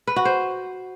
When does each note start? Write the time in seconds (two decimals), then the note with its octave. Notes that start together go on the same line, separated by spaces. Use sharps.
0.07 B4
0.16 F#4
0.25 C5